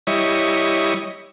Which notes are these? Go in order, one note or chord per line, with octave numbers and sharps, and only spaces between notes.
G3 E4 C#5 D#5